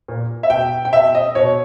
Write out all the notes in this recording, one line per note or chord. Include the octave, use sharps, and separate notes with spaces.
A#2
E5
B2 G5
G5
B2 E5
D#5
B2 C#5